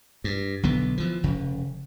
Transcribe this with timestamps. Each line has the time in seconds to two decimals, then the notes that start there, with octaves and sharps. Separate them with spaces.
0.24 G2
0.63 B1 D3 B3
0.97 E3 F3
1.23 F1 C#3